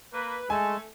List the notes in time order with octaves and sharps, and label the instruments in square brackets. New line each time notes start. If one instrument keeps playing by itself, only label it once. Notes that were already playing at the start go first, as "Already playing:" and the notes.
[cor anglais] A#3 [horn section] B4
[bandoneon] G#3 [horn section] A3 [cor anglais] A4 [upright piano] G#5